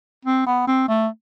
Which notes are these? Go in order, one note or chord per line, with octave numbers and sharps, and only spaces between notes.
C4
B3
C4
A3